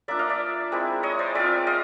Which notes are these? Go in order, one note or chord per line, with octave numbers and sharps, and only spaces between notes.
A#3 D4 F4 D5 E5
D#5 F5
D5 E5
G#3 C4 E4
C#5 D#5
C5 D5
G#3 C4 F4 D5 E5
D#5 F5